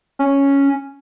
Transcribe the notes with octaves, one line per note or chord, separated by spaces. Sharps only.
C#4